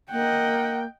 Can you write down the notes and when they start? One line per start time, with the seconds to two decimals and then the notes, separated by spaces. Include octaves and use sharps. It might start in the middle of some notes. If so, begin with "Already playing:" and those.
0.11 A#3 D#5 F#5 G5